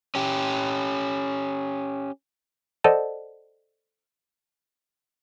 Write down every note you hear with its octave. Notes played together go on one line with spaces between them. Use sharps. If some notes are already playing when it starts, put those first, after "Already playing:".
C#4 G4
A4 C5 D5 D#5 F#5 A5